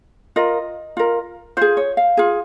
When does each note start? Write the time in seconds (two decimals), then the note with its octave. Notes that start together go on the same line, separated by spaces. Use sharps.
0.36 F4 A#4 D#5
0.97 F4 A#4
1.57 F4 G#4 C5
1.77 C#5
1.97 F5
2.17 F4 G#4